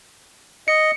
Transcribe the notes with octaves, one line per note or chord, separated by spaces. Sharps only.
D#5 C#7